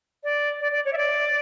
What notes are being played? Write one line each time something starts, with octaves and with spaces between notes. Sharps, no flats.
D5
D5
D5
C#5
E5
D5